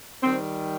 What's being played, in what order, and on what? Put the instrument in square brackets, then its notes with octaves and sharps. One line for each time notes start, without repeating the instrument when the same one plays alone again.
[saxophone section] D#3 G3 C4